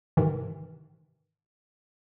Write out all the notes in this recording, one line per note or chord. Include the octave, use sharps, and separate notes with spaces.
G#2 C3 D#3 E3